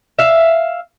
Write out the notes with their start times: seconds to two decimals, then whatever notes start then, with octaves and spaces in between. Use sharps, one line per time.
0.18 E5 F5